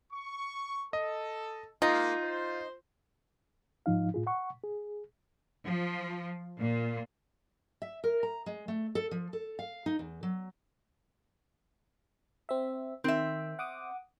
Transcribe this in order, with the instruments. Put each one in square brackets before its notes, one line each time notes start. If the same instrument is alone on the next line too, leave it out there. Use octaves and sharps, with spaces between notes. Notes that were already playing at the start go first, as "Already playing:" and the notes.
[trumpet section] C#6
[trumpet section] A4 [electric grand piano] D#5
[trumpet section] G#3 A#3 [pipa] D#4 [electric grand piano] F4
[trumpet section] C5
[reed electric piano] G#2 F3 D#4 F5
A2 F4 G#4
F#5 C#6
G#4
[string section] F3
A#2
[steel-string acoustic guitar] E5
A#4
A#5
G#3
A3
A4
F3
A4
F5
D#4
E2
F#3
[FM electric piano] C4 E5
[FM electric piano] D#3 [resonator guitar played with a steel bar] C4 E5
[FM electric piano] F#5 D6 D#6